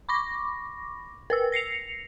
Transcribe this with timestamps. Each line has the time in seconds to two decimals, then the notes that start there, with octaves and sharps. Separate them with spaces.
0.09 B5 C#6 D6 A#6
1.30 A#4 B4 E6
1.52 A#6 C7 C#7 F7